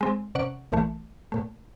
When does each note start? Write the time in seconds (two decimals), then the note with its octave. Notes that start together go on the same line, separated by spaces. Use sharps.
0.01 G#3 C4
0.35 C3 C#4 D5 F#5 C#6
0.72 A#1 A#2 E3 A3
1.32 A#2 A3